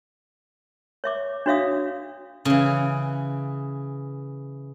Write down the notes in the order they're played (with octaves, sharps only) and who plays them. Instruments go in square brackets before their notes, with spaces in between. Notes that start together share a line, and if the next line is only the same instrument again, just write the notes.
[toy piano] C#5 E5 D6
D4 F#4 C#5 E5 F5 D#6
[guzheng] C#3 E3